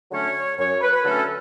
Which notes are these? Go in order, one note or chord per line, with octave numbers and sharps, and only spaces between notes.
D3 F#3 A3 C#4 C#5
F#2 C#5
B4
B4
D3 F#3 A3 C#4 A4